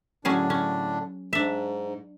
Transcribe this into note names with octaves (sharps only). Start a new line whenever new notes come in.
A2 D3 F#3 C#4 D4 G#4
C#4
G#2 D4 E5